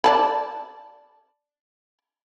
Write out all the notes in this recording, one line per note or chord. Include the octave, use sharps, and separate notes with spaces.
D5 A5 B5